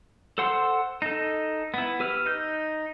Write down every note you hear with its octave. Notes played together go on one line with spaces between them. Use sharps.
A4 C5 F#5 C6 E6
D#4 A4
B3 E4
G4 B4 E6 F6
D#4 G6